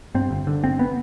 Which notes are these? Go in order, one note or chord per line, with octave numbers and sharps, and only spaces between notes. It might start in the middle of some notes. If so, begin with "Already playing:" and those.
G2 C4
G1
D3
G1 C4
B3